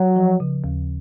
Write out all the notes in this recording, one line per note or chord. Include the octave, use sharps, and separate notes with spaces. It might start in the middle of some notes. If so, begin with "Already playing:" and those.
Already playing: F#3
F3
C#3
D#2